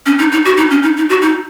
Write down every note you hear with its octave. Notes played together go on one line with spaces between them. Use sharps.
C#4
D#4
D#4
F#4
D#4
C#4
D#4
D#4
F#4
D#4